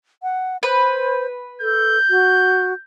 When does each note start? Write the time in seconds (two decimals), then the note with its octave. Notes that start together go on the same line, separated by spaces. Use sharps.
0.23 F#5
0.63 B4 C5
1.61 A4 G6
2.10 F#4